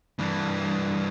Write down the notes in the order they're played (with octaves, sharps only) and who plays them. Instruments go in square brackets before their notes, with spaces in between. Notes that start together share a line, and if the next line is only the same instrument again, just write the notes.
[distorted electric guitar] G2 E3